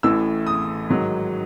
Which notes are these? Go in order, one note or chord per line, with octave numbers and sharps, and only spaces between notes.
A1 A2 E3 E6
D#6
G#2 D#3 F#3